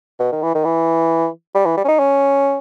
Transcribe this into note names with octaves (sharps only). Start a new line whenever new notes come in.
B2
D#3
E3
D#3
E3
G3
E3
G3
C#4
D#4
C#4